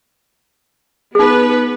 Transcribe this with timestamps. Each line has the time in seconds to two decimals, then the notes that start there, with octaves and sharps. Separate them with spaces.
1.15 B3 D#4 G#4 B4